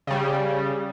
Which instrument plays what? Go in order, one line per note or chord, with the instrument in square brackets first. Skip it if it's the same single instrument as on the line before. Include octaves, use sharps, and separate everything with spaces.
[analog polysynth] C#3 G3